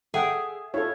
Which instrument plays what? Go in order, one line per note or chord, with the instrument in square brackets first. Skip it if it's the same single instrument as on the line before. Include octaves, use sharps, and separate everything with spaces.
[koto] G#4 [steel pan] A4 F#5 G5 [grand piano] E5
[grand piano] E4 F4 [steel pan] A4 C#5